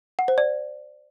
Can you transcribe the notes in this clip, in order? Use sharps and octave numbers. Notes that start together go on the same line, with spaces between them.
F#5
C5
D5